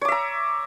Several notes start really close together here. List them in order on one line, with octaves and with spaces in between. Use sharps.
C#5 D6 E5 A#5